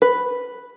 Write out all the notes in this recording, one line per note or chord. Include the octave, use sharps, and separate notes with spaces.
B4